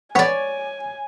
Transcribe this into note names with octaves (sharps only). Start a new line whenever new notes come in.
B3 C#5 D5 G#5